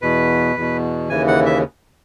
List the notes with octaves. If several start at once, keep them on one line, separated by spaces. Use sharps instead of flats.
E2 B2 B4
E2 B2
D#2 C#3 E3 G#5
F#5
E5